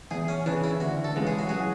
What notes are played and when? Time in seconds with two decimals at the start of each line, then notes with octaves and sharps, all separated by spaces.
0.11 E2 G#4
0.28 C#4
0.46 C#3 E3 D4
0.64 E4
0.80 D2 F#4
1.04 A4
1.16 C#3 E3 G#3
1.27 G#4
1.39 F#4
1.49 F#3 G#4